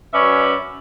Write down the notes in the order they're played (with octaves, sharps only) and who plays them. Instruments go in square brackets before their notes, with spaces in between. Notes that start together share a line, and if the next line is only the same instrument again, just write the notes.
[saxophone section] F#2 C#4 B4 C#5 D5 E5